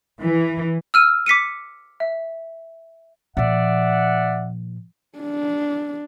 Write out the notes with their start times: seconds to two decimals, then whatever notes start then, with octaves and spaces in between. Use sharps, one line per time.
0.21 E3
0.94 E6 F6 D#7
1.26 D6 B6 C#7 D#7
2.00 E5
3.37 A#2 F3 D5 E5 F#5
5.18 D4